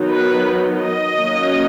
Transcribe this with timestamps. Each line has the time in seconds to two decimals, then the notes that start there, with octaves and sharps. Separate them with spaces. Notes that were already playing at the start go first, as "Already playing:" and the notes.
Already playing: D#3 F#3 B3 D#4
0.11 B4
0.82 D#5
1.18 D#3 F#3 A#3 C#4